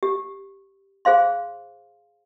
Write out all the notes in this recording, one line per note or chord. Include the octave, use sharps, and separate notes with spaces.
G4
G#4 C5 F5 C6